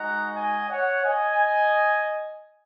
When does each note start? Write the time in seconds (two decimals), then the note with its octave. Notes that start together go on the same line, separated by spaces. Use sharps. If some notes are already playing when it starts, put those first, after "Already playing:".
Already playing: G#3 D#4 F#4 F#5 A#5
0.35 D#5 G#5
0.69 C#5 F#5
1.04 D#5 G#5